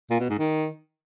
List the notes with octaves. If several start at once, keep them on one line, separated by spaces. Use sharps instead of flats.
A#2
B2
G#2
D#3